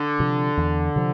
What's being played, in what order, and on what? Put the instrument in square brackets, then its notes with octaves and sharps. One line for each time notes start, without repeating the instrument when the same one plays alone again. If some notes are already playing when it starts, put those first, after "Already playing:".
Already playing: [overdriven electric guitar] D3
[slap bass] C3 F3
E2
C3 F3